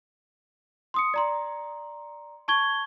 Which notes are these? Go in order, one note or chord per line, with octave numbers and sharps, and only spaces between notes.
C6 D#6 C#7
D5 A#5 C6
A5 C#6 G#6 G7